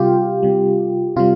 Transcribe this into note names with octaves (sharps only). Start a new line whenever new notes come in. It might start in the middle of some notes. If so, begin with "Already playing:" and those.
Already playing: C3 G3 F4 G4
C3 G3
C3 G3 F4